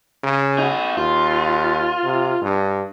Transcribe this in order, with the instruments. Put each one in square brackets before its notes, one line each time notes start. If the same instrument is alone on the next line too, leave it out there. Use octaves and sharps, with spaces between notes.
[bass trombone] C#3
[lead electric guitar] D#4 F#4
[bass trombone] D#2 [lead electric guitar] F4
[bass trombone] C3
G2